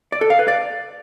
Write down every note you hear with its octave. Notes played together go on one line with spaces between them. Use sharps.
D5
A4
F5
B4
D5